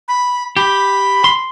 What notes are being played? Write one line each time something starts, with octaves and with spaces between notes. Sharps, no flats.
B5
G4 B5
C6